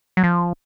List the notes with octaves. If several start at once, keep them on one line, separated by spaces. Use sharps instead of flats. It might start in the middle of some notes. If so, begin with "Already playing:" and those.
F#3
F3